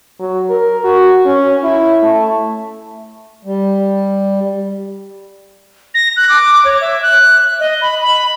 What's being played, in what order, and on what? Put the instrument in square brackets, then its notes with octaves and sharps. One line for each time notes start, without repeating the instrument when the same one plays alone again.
[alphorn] F#3
A#4
F#4
C#4
E4
A3
[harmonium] G3
[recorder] A#6
F#6
D6
C#5
E5
F#6
D#5
B5
B5